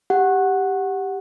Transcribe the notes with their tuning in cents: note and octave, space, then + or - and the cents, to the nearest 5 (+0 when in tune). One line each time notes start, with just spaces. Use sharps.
G4 +0 F#5 +0